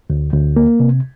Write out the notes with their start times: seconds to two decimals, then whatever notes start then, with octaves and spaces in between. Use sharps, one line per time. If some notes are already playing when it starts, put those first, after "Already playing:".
0.10 D2
0.33 D2
0.56 A#3
0.80 C3